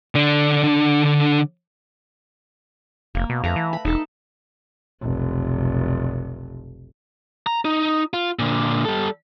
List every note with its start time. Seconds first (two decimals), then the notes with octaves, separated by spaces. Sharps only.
0.15 D3 D4
3.15 F1 A#3
3.29 B2
3.44 F2 A3 B4 A#5
3.56 E3
3.73 B5
3.85 E1 D#4 A4 A5
5.02 F1 B1
7.47 A#5
7.65 D#4
8.14 F4
8.39 A#2 D3
8.85 G3 A4